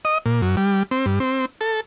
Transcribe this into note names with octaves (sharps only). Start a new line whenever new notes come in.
D#5
A#2
F#2
G3
C4
G2
C4
A4